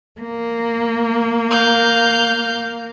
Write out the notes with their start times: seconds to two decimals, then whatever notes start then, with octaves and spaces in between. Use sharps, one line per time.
0.21 A#3
1.50 F5 G6